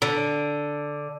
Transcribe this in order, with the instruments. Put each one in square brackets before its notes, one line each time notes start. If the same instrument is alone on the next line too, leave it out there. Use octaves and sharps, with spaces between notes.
[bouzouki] D3